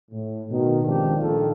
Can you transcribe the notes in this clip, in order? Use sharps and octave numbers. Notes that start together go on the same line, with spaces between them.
A2
B2 D#3
G#1 D#3 F3 D4 G4
A#1 A#2 D#3 F4 A4